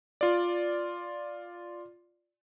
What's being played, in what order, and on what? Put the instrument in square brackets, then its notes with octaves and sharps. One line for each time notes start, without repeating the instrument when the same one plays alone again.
[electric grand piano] F4 D5